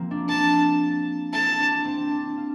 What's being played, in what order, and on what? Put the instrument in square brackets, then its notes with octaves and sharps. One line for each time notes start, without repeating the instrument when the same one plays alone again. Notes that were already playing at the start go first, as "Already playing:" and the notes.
Already playing: [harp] F3 A#3 C4 F4
D4
[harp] D4 [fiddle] A5
[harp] E4 [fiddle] A5
[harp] D4
C4
D4
F4